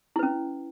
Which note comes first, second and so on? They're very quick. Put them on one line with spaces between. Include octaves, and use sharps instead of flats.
E4 B4 C#4